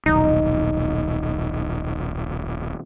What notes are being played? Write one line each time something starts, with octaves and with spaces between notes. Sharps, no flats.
D#1 B1 D#4